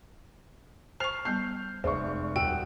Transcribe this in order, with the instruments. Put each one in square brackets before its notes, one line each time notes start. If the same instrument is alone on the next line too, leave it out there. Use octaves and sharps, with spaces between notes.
[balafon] C5 C#6 [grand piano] F6 C7 F7
[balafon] G3 B3 A5 [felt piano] G6 [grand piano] C7
[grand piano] F1 [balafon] G#3 G#4 [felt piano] C5 D5 C#6
[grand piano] D#1 F#4 E6 [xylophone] G5